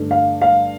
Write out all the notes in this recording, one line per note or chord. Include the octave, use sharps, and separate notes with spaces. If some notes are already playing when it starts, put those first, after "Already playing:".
Already playing: G2 D3 A3
F5
F5